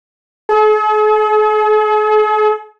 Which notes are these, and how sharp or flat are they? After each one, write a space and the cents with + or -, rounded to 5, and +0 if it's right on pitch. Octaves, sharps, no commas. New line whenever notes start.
G#4 +45